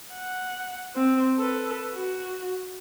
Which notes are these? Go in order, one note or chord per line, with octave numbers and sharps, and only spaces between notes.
F#5
C4
A4 B4
F#4